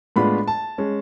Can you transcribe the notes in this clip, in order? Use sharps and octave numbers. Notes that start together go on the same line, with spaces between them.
A2 G#3 B3 D4 F4 B5
A5
G#3 C#4